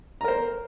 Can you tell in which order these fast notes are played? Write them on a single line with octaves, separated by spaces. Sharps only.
A#5 A#4 C5